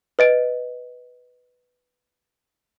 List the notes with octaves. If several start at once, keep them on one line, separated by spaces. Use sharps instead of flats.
B4 D#5 D7